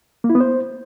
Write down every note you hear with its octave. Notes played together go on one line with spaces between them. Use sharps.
A#3
E4
B3
C5